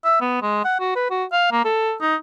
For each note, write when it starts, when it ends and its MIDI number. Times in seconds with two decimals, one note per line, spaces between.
0.05 0.19 76
0.21 0.38 59
0.42 0.62 56
0.65 0.75 78
0.80 0.94 66
0.95 1.08 71
1.11 1.24 66
1.32 1.50 77
1.52 1.62 58
1.65 1.94 69
2.01 2.15 63